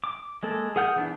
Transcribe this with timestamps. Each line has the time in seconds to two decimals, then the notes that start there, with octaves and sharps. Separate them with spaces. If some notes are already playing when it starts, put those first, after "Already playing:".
0.04 D6
0.43 G#3 A#3 A4
0.76 G#4 A#4 F#5 F6 G6
0.96 E3 B3 D4